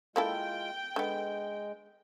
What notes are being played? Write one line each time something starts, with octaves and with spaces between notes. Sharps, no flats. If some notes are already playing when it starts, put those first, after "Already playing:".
G#3 A#3 E4 F4 A4 G5
D3 G#3 B3